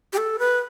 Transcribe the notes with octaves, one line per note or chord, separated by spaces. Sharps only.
G4
A4
B4